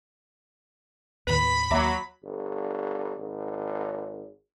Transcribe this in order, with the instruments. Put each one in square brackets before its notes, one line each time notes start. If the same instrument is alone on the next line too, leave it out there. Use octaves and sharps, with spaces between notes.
[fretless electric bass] D#2 A2 [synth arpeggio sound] D#3 B4 [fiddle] B5
[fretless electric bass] D#2 A#3 [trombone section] F#3 [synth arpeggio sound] E5 A#5 D6
[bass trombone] G1
G#1